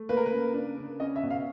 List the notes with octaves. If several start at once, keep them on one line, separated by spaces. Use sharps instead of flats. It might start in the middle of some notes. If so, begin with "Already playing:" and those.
Already playing: A3
A#3 B4
A#4
B4
C#3
D4
C#3
C#4 D#5
E5
B2
F5